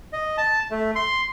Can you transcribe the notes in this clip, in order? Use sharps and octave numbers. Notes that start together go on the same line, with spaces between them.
D#5
A5
A3
C6